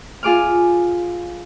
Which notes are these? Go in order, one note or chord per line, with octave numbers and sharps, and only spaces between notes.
F4 G#4 D6 F6